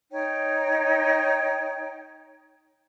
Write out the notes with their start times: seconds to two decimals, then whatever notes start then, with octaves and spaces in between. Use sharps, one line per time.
0.12 D#4 C#5 G5